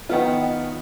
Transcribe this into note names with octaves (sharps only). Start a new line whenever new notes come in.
D#3 B3 F4